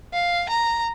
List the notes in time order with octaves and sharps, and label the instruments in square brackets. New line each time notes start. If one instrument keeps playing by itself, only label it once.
[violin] F5
A#5